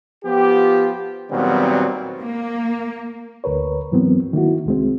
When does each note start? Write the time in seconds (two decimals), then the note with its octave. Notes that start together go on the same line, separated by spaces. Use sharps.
0.24 F3 B3 F4 G4
1.31 A#2 D#3 F#3 G3 B3 C4
2.22 A#3
3.44 D2 A#4 B4 C#5
3.92 G#2 E3 F#3 B3 C4
4.33 D#3 A#3 E4 F#4
4.66 C2 G#3 C4